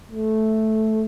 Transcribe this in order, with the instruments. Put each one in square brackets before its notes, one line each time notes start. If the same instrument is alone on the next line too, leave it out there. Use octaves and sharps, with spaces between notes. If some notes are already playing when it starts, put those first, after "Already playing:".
[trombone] A3